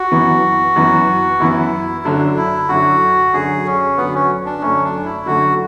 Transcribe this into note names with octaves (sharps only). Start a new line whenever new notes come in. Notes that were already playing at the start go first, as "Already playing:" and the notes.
Already playing: F#4
F#2 E3 B3
F#2 E3 B3
F#2 E3 B3 E4
F#2 D3 F#3 D4
E4
F#2 D3 F#3 F#4
F#2 D3 F#3 G#4
C#4
F#2 D3 F#3 B3
C#4
D4
F#2 D3 A3 C#4
D4
E4
F#2 D3 A3 F#4